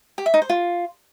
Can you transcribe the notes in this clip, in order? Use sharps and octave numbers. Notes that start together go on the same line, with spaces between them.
G4
E5
D#4
C5
F4